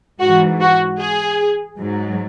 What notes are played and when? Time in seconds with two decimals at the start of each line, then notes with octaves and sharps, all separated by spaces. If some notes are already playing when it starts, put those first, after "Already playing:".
0.20 G#2 E3 F#4
0.60 F#4
0.99 G#4
1.78 G#2 F#3